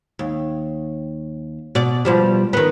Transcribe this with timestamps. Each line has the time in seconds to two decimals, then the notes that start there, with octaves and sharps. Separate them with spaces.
0.19 D#2
1.75 B2 D5
2.05 B2 F3 G3
2.53 D#3 B3